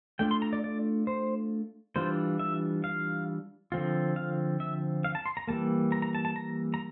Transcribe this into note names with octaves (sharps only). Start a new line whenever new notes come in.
A3 D4 F4 G5
C6
A#5
D5
D5
C5
E3 G3 D4 F4 C5
E5
F5
D3 F3 C4 F4
F5
E5
F5
A5
C6
A#5
E3 G3 A#3 A5
A#5
A#5
A5
A5
A#5
A#5